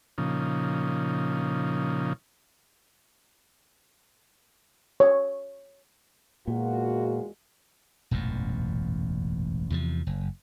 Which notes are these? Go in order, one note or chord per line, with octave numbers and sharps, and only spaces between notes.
A#2 C#3 F3 D#4
C#5
E2 A#2 G#3 A#3 F4 F#4
E1 A1 F#2 A#2
E2 C3 D#3 F3
F#1